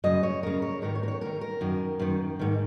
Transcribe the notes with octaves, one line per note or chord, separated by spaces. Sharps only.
F#2 C#3 D#5
C#5
F#2 C#3 A#4
C#5
G#2 D#3 A#4
C#5
A#4
C#5
G#2 D#3 A#4
A#4
F#2 D#3
F#2 D#3
G#2 D#3